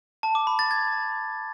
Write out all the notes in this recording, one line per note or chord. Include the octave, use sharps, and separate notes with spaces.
A5
D6
B5
A6
G#6